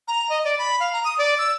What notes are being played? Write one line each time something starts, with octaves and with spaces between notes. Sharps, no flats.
A#5
D#5
D5
B5
F5
A#5
D#6
D5
E6